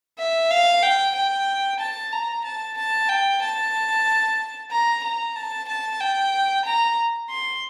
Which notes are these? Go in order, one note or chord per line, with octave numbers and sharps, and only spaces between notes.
E5
F5
G5
G5
A5
A#5
A5
A5
G5
A5
A#5
A#5
A5
A5
G5
A#5
C6